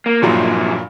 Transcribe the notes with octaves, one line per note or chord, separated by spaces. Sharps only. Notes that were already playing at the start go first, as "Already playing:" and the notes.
A#3
C2 G2 A#2 F3 F#3